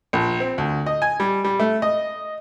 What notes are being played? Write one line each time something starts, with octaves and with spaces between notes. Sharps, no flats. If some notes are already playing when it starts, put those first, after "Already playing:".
A#1
C4
D2
D#5
G#5
G3
G3
A3
D#5